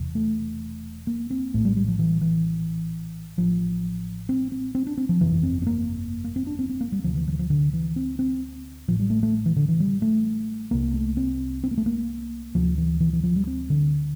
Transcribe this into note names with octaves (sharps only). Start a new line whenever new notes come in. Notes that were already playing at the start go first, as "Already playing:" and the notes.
Already playing: E1 E2 C3
A3
A#3
C4
A#1 A2 A3
G3
G3
F3
E3
E3
A1 A2 F3
C4
C4
C4
D4
C4
F3
G1 F2 C3 E3
C4
C4
A#3
A#3
C4
D4
C4
C4
A#3
G3
D2 C3 F3
E3
F3
E3
F3
D3
E3
C4
C4
A1 A2 F3
G3
A3
A3
E3
D3
E3
G3
A3
C2 C3 A#3
A3
C4
C4
A#3
A3
A#3
D2 C3 F3
E3
E3
E3
F3
G3
C4
D3